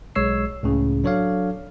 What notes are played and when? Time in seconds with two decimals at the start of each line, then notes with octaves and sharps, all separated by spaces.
0.15 B1 G#3 C#5 E6 C7
0.63 C#2 A2 C#3
1.04 F#3 D4 A4 C#5 D5 F5